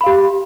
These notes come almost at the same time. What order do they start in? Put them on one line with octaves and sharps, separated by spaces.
B5 F5 G4